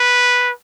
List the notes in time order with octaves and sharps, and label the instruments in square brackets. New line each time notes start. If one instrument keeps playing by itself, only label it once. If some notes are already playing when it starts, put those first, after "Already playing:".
Already playing: [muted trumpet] B4